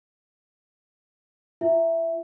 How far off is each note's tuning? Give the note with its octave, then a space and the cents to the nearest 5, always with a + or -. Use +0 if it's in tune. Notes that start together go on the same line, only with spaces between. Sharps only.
F4 -45 E5 +5